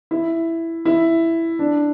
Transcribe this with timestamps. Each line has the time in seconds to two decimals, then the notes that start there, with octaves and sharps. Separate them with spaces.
0.11 E4
0.85 E4
1.59 D4